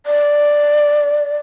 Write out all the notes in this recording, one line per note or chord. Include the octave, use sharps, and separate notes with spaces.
D5